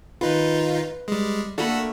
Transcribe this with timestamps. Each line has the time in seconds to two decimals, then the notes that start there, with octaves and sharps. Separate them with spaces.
0.21 D#3 D#4 F4 B4
1.08 G3 G#3
1.58 A3 A#3 D4 F#4 A4 B5